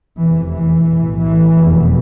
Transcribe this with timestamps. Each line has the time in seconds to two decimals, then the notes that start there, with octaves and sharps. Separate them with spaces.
0.19 F1 E2 C3 E3
0.52 E3
0.86 B1 A2
1.20 E3
1.54 F1 E2 B2